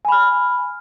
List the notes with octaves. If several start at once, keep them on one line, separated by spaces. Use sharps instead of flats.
G#5 B5 F6